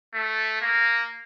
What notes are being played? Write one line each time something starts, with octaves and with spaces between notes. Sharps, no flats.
A3
A#3